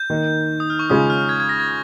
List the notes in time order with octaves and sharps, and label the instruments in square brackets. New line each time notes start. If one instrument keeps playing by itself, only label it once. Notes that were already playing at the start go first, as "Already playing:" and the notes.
Already playing: [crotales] G6
[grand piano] D#3 A#3 D#4
[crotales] D#6
F6
C#6
[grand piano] C#3 G#3 C#4 F4 [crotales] D#6
[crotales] F6
G#6
G#6
A#6
G#6